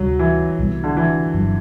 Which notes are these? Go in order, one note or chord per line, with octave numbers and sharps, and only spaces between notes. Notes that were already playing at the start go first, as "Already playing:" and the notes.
Already playing: D2 C3 F#3 G3 D4
E3
C2 B2 G3
D3
E3
G1 G2 F#3